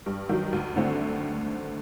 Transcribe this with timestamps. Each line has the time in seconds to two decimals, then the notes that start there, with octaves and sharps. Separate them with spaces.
0.06 G2
0.29 D#3 F#3
0.53 D2
0.76 D3 A3 C4